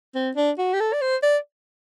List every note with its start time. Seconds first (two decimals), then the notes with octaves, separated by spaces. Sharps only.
0.15 C4
0.36 D4
0.58 F#4
0.73 G4
0.80 A4
0.93 D5
1.01 C5
1.23 D5